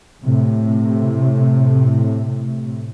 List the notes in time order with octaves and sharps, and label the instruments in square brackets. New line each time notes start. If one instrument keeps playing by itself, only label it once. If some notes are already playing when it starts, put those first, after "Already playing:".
[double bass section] A2 C3